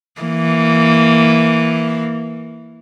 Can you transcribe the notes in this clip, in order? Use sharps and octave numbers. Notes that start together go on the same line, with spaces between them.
E3 A#3